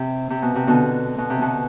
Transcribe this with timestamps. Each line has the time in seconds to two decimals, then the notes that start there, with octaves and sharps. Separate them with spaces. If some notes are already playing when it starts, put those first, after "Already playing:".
Already playing: C3
0.30 C3
0.42 B2
0.56 C3
0.67 B2 D3
1.18 B2
1.30 C3
1.41 B2 D3